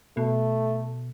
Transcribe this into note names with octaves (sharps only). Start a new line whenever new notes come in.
B2 A3